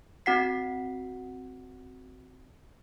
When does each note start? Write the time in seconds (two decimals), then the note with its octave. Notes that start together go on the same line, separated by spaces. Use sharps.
0.26 C4 F#4 F#5 B6 C7